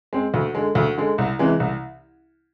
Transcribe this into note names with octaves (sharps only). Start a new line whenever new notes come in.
G#3 C4
D2
D3 G#3
D2
D3 G#3
C2
C3 E3 G#3
C2